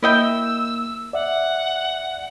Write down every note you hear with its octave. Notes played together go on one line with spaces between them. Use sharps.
A#3 E4 D#5 G5 E6
D5 E5 F#5